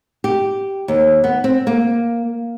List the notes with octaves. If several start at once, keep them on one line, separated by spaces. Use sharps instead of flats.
G4
D#2
B3
C4
A#3